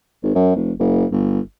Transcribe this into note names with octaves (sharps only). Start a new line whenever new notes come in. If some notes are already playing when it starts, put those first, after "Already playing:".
G#1
F#2
F1
F#1
G1